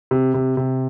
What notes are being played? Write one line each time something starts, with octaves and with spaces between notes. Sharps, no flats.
C3
C3
C3